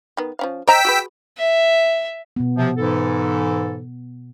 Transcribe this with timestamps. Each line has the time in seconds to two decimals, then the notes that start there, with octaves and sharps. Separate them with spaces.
0.17 D#3 B3
0.39 F3 C#4 F5
0.68 C5 D#5 G5 A#5 E6 B6
0.85 F#4 G#4 B4
1.38 E5
2.36 B2 B3
2.57 C3 F3
2.76 G#2 E3 A4